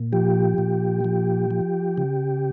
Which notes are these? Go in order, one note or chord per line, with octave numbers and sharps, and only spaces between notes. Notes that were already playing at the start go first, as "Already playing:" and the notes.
Already playing: A#2
F3 G4
A#2
F3
F3
C#3